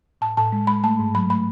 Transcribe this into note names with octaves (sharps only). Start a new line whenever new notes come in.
A2 A5
A2 A5
G#3
G#3 B5
A3 A5
G#2
F#3 B5
A3 B5